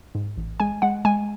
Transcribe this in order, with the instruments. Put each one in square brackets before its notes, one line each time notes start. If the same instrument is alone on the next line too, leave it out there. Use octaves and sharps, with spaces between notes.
[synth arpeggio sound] G#2
A1
G#3 G#5
G#3 F#5
G#3 G#5